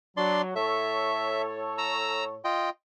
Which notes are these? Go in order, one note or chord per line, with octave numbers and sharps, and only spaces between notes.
F#3 D4 D5 C6
A2 A4 C#5 E5
A#5 E6
F4 D#5 G5